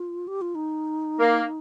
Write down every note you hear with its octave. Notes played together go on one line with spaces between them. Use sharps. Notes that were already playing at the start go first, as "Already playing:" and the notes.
Already playing: F4
G4
F4
D#4
A#3